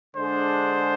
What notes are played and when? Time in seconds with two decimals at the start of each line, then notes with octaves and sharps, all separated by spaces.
0.16 D3 G#3 D4 G#4 C5